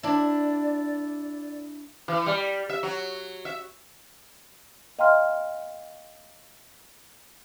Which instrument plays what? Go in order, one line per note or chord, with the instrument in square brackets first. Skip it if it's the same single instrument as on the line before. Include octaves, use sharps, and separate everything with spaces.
[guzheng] D4 E4 [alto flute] D5
[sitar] E3
G3
E5
F#3
E5
[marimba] D#5 F5 G5 A#5 C6 F6